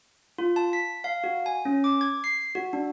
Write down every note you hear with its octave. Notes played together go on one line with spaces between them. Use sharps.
F4
A5
B6
F5
F#4
G#5
C#4
D6
G#6
C7
F#4
D4